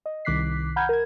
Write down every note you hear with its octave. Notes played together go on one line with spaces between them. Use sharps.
D#5
C2 D#3 D6 F#6 B6 C7
F#5 A#5 B5 F6 G6 G#6
A#4 G#6